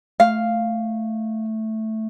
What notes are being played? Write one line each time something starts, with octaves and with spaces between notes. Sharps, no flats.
A3 F5